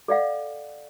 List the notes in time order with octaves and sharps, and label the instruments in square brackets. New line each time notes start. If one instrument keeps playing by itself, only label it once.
[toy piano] A4 D5 D#5 F5 F#5